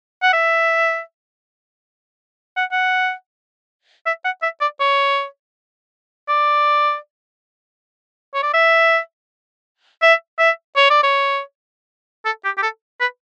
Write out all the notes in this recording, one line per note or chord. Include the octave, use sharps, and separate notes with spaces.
F#5
E5
F#5
F#5
E5
F#5
E5
D5
C#5
D5
C#5
D5
E5
E5
E5
C#5
D5
C#5
A4
G4
G4
A4
B4